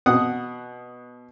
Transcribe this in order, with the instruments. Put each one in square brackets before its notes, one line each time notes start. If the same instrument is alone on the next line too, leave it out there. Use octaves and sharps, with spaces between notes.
[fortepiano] B2 F#5 D#6